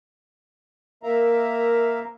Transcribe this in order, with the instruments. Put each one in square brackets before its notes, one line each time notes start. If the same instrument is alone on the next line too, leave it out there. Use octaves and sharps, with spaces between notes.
[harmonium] A#3 A#4 E5 F5 A#5